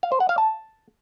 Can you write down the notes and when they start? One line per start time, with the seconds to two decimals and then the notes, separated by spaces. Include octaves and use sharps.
0.03 F5
0.12 C5
0.20 F#5
0.29 F5
0.38 A5